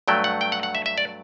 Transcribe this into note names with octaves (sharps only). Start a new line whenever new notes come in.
G2 F#3 A3 G5
F#5
G5
F#5
F#5
E5
E5
D5